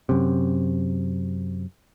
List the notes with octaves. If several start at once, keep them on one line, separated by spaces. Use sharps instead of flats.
F#2 C3